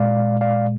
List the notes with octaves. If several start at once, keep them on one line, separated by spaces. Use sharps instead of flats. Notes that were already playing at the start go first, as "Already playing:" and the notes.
Already playing: A#2 G#3 D5 F5
D5 F5